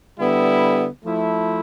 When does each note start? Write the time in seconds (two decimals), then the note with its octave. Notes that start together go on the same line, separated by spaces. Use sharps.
0.18 D3 G3 B3 E4
1.04 F3 A3 E4